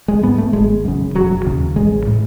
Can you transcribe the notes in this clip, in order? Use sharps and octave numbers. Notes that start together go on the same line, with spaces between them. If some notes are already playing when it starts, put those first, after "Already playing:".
G#3
G#2 B3
A3
G#1 G#3
F#2 C#3
E1 F#3
D#2 C#3
A1 G#3
A2